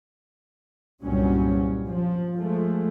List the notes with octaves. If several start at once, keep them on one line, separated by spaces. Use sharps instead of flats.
C2 G2 A#2 F#3 G3 C#4
F3
F3 G#3 A3